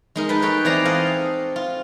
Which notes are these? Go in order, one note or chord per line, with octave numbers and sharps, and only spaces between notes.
G#3 D#4 A#4
B4 G5 A5
A4 C#5 G5
E3 C4 D5 G#5 A#5 C6
A4 D#5 F5 F#5
F4